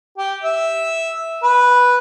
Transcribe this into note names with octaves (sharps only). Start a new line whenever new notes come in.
G4
E5
B4